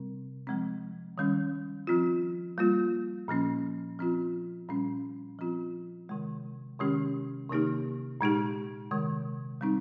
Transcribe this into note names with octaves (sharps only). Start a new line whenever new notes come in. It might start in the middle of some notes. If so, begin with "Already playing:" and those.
Already playing: C3 G3 C4
F3 G#3 C4
D#3 G3 C#4
F3 C4 F4
G3 A#3 F4
A#2 F3 A#3 C#4
F3 C4 F4
A#2 G3 C#4
F3 C4 F4
C3 D#3 G#3
C3 D#3 G#3 C#4 G4
C3 D#3 A#3 D#4 G4
A#2 G#3 D#4 G4
C3 D#3 G#3
G3 C4 D#4